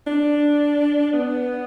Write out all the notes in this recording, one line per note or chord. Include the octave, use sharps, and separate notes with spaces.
D4
B3